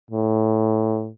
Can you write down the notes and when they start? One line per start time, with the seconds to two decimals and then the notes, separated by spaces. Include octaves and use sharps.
0.11 A2